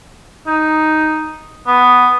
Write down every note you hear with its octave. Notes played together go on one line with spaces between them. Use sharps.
D#4
B3